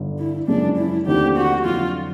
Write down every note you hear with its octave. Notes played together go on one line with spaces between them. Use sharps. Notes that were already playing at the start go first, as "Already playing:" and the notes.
Already playing: G1 G2 D3
E4
F#2 C#3 F3 G#3 D4
E4
D#2 D3 F3 A3 C4 G4
F#4
F2 D3 F#3 F4